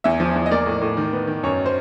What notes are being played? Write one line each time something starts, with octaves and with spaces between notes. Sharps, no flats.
E2 E5
F3
E2
D#5
A#3 D5
A2
A2
D#3
B3
D#3
F#2 C#5
C5